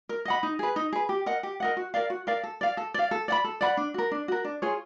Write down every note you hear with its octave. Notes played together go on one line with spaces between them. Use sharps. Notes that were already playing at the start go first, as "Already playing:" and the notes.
A#4
D#5 F#5 B5
D#4
G#4 B4
D#4
G#4 B4
G4
A#4 D#5 F#5
G4
A#4 D#5 F#5
F#4
A#4 D5 F5
F#4
A#4 D5 F5
A4
D5 F5
A4
D5 F5
A4
D5 F#5 B5
A4
D5 F#5 B5
D4
F#4 A#4
D4
F#4 A#4
D4
F4 G#4 C#5